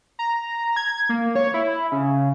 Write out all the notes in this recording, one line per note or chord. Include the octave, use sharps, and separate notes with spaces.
A#5
G#6
A#3
C#5
E4
C#3